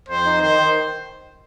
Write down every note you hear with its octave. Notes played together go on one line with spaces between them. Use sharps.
F2 C5
D#4
D#3 C5
D#3